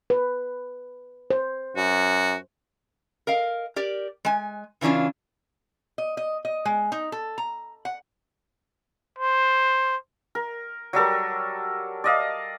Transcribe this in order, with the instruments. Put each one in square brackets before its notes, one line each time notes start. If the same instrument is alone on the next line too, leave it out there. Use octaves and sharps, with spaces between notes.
[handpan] B4
C5
[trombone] F#2 [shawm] F#4
[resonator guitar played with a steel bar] A#4 D#5 F5
G4 A#4 D5
G#3 G#5
C#3 E3 C#4 D4 F4
D#5
D#5
D#5
G#3
D#4
A4
A#5
F#5
[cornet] C5
[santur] A#4
F#3 G3 A4 A#4
D5 D#5 F5